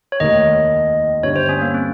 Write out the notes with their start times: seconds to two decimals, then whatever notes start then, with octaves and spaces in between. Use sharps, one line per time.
0.12 C#5
0.20 F1 D#2 D#3 A#3 D#5
1.23 G1 G2 G3 C#5
1.36 C5
1.49 C#4
1.62 A#3
1.74 C4